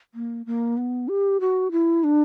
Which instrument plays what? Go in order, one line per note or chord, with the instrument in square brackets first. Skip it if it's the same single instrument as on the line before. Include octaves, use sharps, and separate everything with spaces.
[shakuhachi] A#3
A#3
B3
G4
F#4
E4
D4